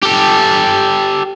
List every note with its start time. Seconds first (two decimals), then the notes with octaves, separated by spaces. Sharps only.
0.03 G4 A4